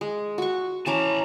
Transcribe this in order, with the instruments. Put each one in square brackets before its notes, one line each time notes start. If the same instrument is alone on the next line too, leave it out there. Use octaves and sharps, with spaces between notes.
[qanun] G#3
F#4 C#6
[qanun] E3 C#4 D6 [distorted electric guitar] A5 A#5